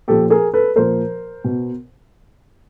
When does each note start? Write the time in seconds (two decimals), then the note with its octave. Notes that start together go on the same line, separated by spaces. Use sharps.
0.08 A#2 F3 G4 A4
0.30 G#4 A#4
0.54 A4 B4
0.76 A#2 F3 A#4 C5
1.44 B2